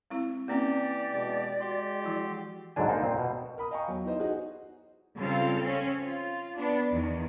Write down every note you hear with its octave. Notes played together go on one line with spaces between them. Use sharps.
G#3 C4 E4
E3 A#3 C4 C#4 G4 D5
B2 G#3
G#3 F#4 G4 C6
E3 F3 E4
G#2 D3 F#3 D4 G#5
A#3 D#4 C5
A#2 C4
B2
A#4 B5 D#6
D#5 F5 G5 G#5 A#5 C#6
E2 F#3
D#4 E4 B4 C5 D#5
D#4 F#4 G#4 D#5
C#3 G3 C4 F4 A4 F5
C4 C#4
F4
B3 D4
E2 D#3